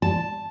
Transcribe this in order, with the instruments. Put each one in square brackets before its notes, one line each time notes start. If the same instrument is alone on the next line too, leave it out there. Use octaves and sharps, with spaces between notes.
[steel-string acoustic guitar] A5